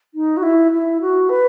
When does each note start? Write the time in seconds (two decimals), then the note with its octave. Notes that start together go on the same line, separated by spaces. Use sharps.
0.14 D#4
0.37 F#4
0.43 E4
0.72 E4
1.01 F#4
1.29 B4